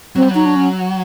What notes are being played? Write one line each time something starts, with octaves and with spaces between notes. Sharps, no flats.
F#3 C4
G3
F#3 D#4
D4
C#4